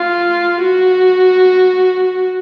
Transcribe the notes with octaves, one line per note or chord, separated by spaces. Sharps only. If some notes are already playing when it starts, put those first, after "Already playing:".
Already playing: F4
F#4